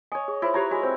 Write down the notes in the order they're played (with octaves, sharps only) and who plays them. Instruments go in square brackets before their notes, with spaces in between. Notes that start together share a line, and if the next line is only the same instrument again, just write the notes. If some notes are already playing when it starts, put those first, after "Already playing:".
[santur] C#5 D#5 [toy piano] G#5
[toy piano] G#4
[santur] E4 [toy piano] F4 C5 C6
[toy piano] F4 G4 [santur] B4 C#5 A#5
[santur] G#3 [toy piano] F#4
[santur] C4 [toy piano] C5